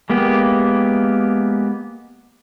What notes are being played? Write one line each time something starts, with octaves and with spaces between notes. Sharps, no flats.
G#3 A#3 B3 G4